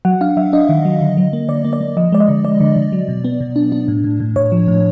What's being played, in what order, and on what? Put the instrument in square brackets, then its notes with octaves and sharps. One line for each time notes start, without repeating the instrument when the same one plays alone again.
[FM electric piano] F#3 F#5
D4 F5
F#3 E5
D4 D#5
D#3
F#3
D3
F#3
A#3
D3 D5
A#3
D5
A#3
F3 D#5
G#3 D5
D#5
D3
G#3 D5
D3
D3
F#3
B2
B3
B2
D4
D4
A2
A2
A2
A2 C#5
F3
A2